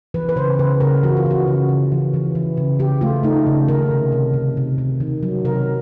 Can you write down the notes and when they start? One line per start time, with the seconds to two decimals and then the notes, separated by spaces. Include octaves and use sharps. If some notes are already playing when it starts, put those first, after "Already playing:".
0.14 E3 B4
0.29 B4
0.36 C#3 C5
0.59 C#3 B4
0.80 C#3 A#4
1.03 E3 F#4
1.17 F4
1.26 E3
1.31 F#4
1.48 C#3
1.69 C#3
1.92 E3
2.14 E3
2.35 E3
2.57 C#3
2.79 C#3 G4
3.01 A3 F4
3.23 A3 D#4
3.47 C#3
3.68 D#3 A#4
3.91 C3
4.12 C3
4.34 C3
4.57 C3
4.78 C3
5.00 D#3
5.23 F#3
5.45 C3 A#4